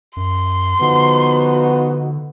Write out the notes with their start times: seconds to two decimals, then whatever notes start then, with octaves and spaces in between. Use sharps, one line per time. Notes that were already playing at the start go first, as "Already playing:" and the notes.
0.17 F#2 C6
0.81 D3 F3 B3 D#4 F#4